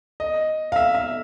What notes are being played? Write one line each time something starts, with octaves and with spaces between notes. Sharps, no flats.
D#5
F5
E5
E5